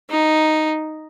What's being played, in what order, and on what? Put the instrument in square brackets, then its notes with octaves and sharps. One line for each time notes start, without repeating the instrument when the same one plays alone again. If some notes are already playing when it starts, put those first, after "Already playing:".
[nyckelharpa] D#4